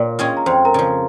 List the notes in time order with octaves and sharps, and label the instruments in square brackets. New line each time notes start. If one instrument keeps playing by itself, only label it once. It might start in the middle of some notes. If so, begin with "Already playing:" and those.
Already playing: [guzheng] A#2 [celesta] C#5
[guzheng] G#3 C#4 F4 G#4
[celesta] A#5
[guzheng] F2 [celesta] C5 C6
[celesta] A#4 A#5
[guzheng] C#3 F3